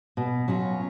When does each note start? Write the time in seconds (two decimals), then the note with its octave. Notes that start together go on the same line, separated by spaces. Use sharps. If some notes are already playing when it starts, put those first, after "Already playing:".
0.17 B2
0.48 F#3 C#4 F4